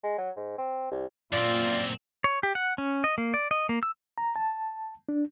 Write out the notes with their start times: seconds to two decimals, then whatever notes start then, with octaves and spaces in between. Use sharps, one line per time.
0.03 G#3
0.18 F#3
0.36 G#2
0.58 C4
0.91 C2
1.33 F#2 A#2 C4 F4 D5
2.24 C#5
2.43 G4
2.55 F#5
2.78 C#4
3.04 D#5
3.18 A#3
3.34 D5
3.51 D#5
3.69 A#3
3.83 E6
4.18 A#5
4.36 A5
5.09 D4